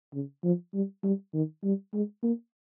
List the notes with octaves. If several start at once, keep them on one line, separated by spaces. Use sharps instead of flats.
C#3
F3
G3
G3
D#3
G3
G#3
A#3